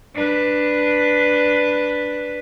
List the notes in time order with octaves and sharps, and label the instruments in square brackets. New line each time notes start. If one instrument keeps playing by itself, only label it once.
[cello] D4 B4